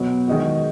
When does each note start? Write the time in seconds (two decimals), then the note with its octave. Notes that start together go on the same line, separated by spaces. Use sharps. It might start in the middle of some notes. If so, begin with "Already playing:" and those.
Already playing: B2 F#3 B3 F#4
0.27 D#3 G#3 D#4 F#4